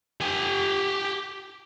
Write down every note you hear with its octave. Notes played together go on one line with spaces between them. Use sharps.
G4 G#5